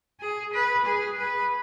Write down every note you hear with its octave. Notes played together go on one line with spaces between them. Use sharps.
G#4
B4
G#4
B4